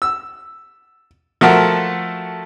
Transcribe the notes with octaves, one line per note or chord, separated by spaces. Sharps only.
E6
F3 A3 F#4 A4 A#4